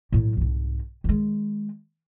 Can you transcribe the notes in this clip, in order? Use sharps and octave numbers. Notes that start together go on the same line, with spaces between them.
A2 F#3
C2 G#2
D#3 G#3